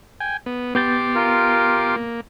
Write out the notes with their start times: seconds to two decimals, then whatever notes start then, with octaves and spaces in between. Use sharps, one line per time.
0.20 G5 G#5
0.46 B3
0.75 B3 G4 C6 D6 G6 A6
1.15 F4 A#4
1.96 A#3